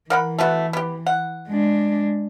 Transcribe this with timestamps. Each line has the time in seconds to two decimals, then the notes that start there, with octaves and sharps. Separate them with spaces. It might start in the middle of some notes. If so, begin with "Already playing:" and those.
0.10 E3 A#4 F#5 B5
0.39 A3 B3 F#4
0.73 B3 G4
1.06 F#5
1.48 G#3 D4